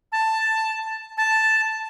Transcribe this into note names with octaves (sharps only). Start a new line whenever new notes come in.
A5
A5